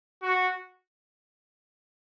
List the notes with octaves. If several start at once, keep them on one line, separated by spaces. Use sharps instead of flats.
F#4